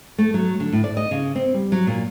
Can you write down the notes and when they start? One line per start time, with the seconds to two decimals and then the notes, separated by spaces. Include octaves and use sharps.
0.18 A3
0.34 F#3
0.60 D3
0.73 A2
0.84 D5
0.97 D#5
1.11 C#3
1.35 C4
1.54 G3
1.72 F#3
1.87 A#2